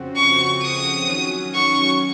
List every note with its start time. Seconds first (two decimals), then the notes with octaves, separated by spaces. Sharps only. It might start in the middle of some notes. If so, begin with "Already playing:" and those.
Already playing: F2 C#3 F3 C4 F#4
0.16 C#6
0.62 D#6
1.08 D#3 F#3 C#4 F#4
1.54 C#6